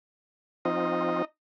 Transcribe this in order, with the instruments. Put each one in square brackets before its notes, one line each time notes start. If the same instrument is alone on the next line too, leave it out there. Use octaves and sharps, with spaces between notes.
[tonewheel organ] F3 C4 F4 [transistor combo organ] D#4 D#5